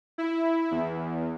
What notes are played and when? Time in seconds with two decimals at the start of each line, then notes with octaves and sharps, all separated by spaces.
0.18 E4
0.71 E2